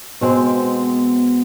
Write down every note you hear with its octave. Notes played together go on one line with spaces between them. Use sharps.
B2 G#3 B3 C4